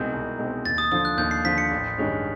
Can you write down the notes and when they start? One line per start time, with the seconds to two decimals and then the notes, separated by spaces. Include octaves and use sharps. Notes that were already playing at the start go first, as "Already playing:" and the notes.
Already playing: C2 B2 G#3 C4 D#4 G6
0.13 C2
0.38 B2 G#3 C4 D#4
0.65 D#2 A6
0.78 D#6
0.92 D3 F3 D#6
1.05 F#6
1.18 D#2 G6
1.31 C7
1.45 D3 F3 B6
1.58 C#7
1.71 A1
1.98 G2 D#3 G#3 C#4